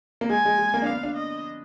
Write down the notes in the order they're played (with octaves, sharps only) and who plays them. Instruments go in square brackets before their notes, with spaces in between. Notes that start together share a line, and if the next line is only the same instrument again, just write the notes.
[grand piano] A#3
[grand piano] G#3 [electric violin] G#5
[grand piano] G#3
G#3
A#3
D4
[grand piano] B3 [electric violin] F5
[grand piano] D4
[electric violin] D#5